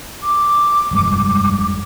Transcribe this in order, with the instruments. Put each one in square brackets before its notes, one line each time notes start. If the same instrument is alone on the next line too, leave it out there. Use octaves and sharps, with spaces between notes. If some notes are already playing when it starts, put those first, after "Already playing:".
[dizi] D6
[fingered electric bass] F1 G2 G#3